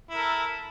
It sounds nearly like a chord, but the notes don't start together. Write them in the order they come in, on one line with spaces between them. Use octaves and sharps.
E4 A#4 A4